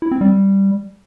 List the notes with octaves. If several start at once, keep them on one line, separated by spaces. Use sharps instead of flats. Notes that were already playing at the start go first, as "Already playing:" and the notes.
E4
C4
G3